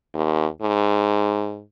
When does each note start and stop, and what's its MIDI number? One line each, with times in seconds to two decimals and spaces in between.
0.14 0.47 39
0.62 1.63 44